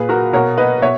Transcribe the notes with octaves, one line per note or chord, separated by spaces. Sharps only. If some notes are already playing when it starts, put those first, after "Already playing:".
Already playing: A#2 G#4 B4
F#4 A#4
B2 A#4 C#5
B4 D#5
B2 C#5 E5